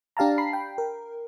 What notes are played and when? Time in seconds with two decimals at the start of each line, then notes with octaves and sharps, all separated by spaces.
0.17 D4 G4 F5 A5 A#5
0.38 B5 C7
0.53 G5
0.78 A#4